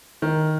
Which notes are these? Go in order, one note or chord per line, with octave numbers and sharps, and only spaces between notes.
D#3